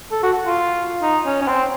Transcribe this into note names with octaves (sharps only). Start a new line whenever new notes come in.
A4
F#4
F4
D#4
C#4
C#4
C4